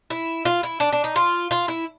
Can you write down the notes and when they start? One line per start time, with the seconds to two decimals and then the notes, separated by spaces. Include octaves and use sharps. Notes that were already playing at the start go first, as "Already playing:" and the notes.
0.10 E4
0.45 F4
0.63 E4
0.80 D4
0.92 D4
1.04 D#4
1.16 F4
1.51 F4
1.68 E4